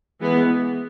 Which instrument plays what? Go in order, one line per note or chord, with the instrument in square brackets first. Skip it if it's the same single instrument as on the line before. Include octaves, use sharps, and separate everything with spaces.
[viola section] E3 G#3 B3